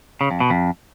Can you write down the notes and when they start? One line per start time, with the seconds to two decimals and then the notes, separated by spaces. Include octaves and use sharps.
0.21 C#3
0.31 F2
0.40 B2
0.50 F2